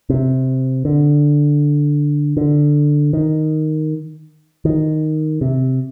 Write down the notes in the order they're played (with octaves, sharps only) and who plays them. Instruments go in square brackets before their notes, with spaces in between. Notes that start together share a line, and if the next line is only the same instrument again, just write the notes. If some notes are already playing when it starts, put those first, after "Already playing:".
[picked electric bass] C3
D3
D3
D#3
D#3
C3